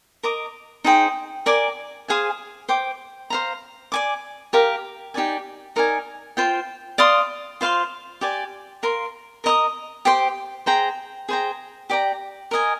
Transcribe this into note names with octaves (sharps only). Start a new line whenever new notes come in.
A#4 D#5 A#5 D6
D#4 G#4 C5 G5
A#4 D5 G#5 D6
G#4 C5 F5 G#5
C5 G5 D6
C5 F5 A#5
D5 G#5 D6
G4 A#4 F5
D#4 G4 D5 G#5
D#4 A#4 D5 G#5
F4 C5 G5
D5 F5 C6 D#6
F4 C5 F5 C6
G4 D5 G#5
A#4 F5 C6
A#4 D#5 A#5 D#6
G4 C5 G5 C6
G#4 C5 G5 A#5
G#4 C5 G5 A#5
G4 D5 G5 A#5
A#4 D#5 G#5